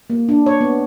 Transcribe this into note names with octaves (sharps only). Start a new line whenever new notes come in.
A#3
D4
C#5
B3